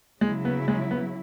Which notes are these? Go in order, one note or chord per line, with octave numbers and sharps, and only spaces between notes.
C#3 F#3 G#3 E4
B3
G#3
B3